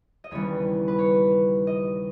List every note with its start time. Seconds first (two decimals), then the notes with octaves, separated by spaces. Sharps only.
0.24 D#5
0.31 D#2 C#3 E3 G3 B3 C#5
0.88 B4
0.99 C#5
1.67 D#5